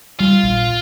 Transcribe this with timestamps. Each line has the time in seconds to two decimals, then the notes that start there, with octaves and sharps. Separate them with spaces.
0.20 G3 F4
0.43 A#1